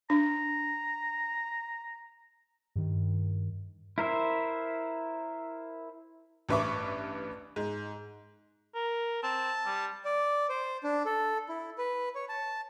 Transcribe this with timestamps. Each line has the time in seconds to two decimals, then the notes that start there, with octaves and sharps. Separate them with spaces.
0.10 D4 A#5
2.76 G2 D#3
3.98 E4 A#4 C5 E5
6.49 A1 G2 B4 E5 C#6 D6
7.56 G#2
8.75 A#4
9.23 C4 A5
9.66 G3
10.05 D5
10.49 C5
10.84 D4
11.06 A4
11.49 E4
11.78 B4
12.15 C#5
12.29 A5